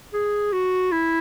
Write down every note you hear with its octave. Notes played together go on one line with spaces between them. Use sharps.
G#4
F#4
E4